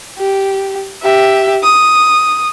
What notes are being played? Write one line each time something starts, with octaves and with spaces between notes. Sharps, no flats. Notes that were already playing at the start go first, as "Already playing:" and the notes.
G4
G4 E5
D#6